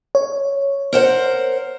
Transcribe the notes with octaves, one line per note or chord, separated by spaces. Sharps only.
C#5
A#4 C5 F#5